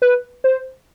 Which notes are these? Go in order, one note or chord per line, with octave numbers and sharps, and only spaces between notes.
B4
C5